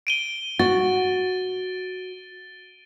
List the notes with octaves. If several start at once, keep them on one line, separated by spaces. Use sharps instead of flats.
D7 D#7 G7
F#4 A6